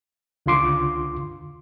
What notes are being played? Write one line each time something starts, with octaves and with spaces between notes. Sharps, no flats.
C#2 D3 F4 C6 D6